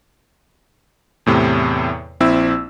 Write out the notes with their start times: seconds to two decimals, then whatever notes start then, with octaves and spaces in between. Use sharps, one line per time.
1.26 E2 A2 C3
2.20 A#1 C4 E4 E6